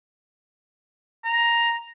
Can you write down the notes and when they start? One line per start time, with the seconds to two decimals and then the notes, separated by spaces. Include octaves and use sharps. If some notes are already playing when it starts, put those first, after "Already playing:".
1.25 A#5